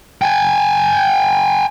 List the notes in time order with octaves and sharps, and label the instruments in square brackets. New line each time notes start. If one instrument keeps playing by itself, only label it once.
[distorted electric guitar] G5 G#5